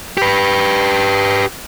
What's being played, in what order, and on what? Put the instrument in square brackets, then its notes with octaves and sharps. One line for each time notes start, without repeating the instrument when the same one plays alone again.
[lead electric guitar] G4 B4